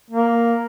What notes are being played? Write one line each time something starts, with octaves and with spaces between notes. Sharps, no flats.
A#3